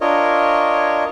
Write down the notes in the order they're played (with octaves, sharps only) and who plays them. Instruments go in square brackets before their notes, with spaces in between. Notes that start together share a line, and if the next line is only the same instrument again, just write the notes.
[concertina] D4 F4 A#4 C#5 D#5